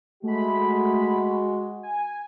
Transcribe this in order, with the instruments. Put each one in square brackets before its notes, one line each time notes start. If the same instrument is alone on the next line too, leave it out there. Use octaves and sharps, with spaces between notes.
[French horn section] G#3 F#4 [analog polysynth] A3 B5
[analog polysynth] G#5